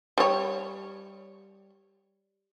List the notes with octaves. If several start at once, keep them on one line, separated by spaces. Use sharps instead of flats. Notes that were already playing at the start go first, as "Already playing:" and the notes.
G3 C#5